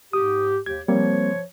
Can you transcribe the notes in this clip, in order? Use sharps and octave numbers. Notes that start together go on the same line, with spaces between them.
G#2 G4 D#6
D#2 G4 G#6
F3 G3 A#3 C4 C#5